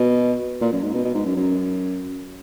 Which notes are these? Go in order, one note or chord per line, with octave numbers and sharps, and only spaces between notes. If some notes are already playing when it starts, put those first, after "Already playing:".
Already playing: B2
A#2
F#2
G#2
B2
B2
G#2
F#2
F#2